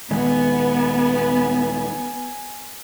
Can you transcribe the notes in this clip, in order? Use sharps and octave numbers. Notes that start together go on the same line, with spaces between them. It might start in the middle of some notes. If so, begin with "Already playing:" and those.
D#1 D#3 G#3 B3 G#5